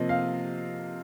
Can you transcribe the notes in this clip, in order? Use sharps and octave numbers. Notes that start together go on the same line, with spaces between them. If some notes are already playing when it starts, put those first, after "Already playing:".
Already playing: C3 F3 A#3 D#5
F5